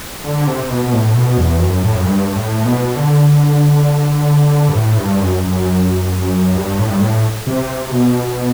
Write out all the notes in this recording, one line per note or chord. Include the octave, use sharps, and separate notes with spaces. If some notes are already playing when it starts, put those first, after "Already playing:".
D3
C3
C3
B2
B2
A2
B2
E2
F#2
A2
F#2
G2
A2
B2
D3
G2
A2
G2
F#2
F#2
G2
A2
G2
A2
C3
B2